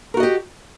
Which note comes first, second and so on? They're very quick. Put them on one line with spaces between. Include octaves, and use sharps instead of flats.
A#4 F#4 D#5 G4